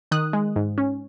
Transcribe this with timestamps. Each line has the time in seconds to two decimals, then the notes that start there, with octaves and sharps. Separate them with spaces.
0.11 D#3 D#6 F#6
0.33 G#3
0.56 G#2
0.78 C#4